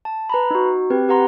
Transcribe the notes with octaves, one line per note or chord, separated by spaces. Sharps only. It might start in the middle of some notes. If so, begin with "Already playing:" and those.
A5
B4 A#5 B5
D#4 F#4
C4 G4 B4
G4 B4 F#5 A#5 C6